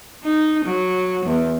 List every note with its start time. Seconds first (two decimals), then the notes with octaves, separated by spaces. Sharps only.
0.24 D#4
0.65 F#3
1.26 E2